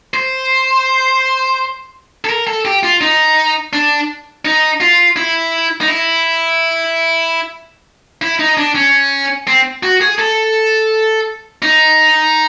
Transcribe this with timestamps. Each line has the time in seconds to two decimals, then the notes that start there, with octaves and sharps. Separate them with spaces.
0.14 C5
2.25 A4
2.30 A#4
2.47 A4
2.65 G4
2.83 F4
3.01 D#4
3.73 D4
4.45 D#4
4.80 F4
5.16 E4
5.81 D#4
5.88 E4
8.22 E4
8.39 D#4
8.57 D4
8.75 C#4
9.47 C4
9.83 F#4
10.01 G#4
10.19 A4
11.62 D#4